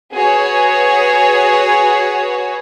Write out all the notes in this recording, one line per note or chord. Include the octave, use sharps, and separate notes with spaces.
F#4 G#4 B4 C#5